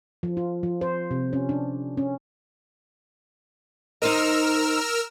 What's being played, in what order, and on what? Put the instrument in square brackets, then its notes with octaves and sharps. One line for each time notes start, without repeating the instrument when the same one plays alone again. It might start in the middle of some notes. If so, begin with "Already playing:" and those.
[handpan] F3
F4
F3
C5
C3
C#4
D4
C#4
[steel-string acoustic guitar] D#4 C5 D#5 [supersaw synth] A#4 E6 F6